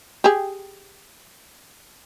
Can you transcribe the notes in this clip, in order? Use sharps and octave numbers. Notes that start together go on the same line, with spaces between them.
G4 G#4